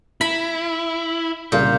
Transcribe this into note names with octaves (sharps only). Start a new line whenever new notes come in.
E4 B5
C2 A#2 C#3 F5 G6